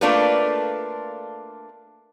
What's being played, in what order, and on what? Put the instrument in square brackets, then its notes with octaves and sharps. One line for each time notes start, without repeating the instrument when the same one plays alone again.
[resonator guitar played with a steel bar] A3 A#3 D4 F4 A4 B4